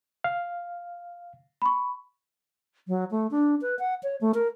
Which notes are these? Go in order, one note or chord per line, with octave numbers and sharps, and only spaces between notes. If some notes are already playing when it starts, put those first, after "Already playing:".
F5
B5 C#6
F#3
A3
D4
B4
F#5
C#5
A3
A#4